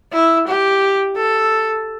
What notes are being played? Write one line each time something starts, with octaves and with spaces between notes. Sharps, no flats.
E4
G4
A4